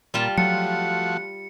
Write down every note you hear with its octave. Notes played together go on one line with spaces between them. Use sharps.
A#2 G3 F4 A5
F3 F#3 A3 F#4 C#7